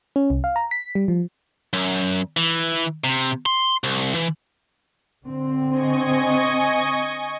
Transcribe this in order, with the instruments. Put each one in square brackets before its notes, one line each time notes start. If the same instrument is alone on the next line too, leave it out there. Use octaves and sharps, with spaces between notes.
[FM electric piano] C#4
C2
F5
A#5
B6
G3
F3
[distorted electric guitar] F#2
E3
C3
C6
C2
E3
[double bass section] D3 C4
[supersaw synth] D#5 G#5 C#6